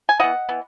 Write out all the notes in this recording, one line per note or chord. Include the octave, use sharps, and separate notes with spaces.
G#5
E3 B3 D#5 F#5
E3 B3